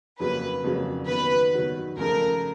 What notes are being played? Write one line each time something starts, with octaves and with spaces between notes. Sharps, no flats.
F2 C#3 F#3 A#3 B4
F2 C#3 F#3 A#3
D#3 F#3 B3 B4
D#3 F#3 B3
C#2 C#3 F3 A3 A#4